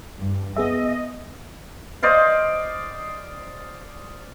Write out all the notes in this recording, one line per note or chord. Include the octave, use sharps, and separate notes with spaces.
G2
B3 G#4 D#5 E5
C5 D5 D#5 F5